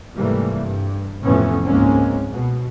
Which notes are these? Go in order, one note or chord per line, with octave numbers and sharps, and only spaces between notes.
G#2 C3 E3 G3 A3 A#3
G2
F2 A2 C3 E3 B3 C#4
C#2 G#2 G#3 A#3 C4 C#4
B2